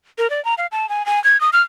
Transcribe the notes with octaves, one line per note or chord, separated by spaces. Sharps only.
A#4
D5
A#5
F5
A5
G#5
G#5
G#6
D#6
F6